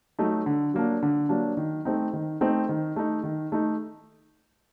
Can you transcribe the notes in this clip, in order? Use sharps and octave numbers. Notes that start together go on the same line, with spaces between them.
F#3 A3 D#4
D3
F#3 A#3 D4
D3
F#3 A#3 D4
D#3
A3 C4 D#4
D#3
A3 C4 D#4
D#3
A3 D#4
D#3
A3 D#4